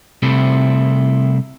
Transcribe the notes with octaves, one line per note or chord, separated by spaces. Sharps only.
C2 C3 A3 C4 E4